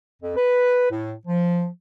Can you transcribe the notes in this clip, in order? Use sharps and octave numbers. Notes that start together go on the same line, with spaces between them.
F2
B4
A2
F3